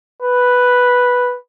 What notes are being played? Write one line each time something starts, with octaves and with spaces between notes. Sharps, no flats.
B4